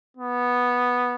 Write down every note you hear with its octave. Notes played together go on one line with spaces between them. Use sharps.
B3